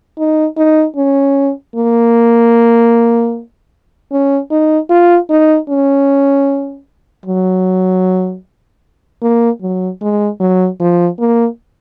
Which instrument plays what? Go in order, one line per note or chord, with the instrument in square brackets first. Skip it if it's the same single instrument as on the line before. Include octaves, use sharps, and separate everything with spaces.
[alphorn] D#4
D#4
C#4
A#3
C#4
D#4
F4
D#4
C#4
F#3
A#3
F#3
G#3
F#3
F3
A#3